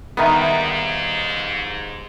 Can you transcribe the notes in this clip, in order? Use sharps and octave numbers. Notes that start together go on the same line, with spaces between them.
D#2 G#2 D#3 G3 B3 D#4 E5